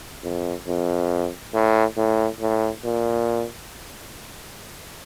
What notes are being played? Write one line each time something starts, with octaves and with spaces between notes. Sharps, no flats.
F2
F2
A2
A2
A2
A#2